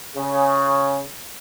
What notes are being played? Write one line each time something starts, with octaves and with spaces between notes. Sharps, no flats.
C#3